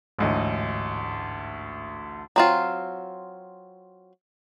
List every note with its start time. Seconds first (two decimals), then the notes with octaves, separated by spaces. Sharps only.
0.18 A1 D2 G#2 D#5
2.36 F#3 C4 F4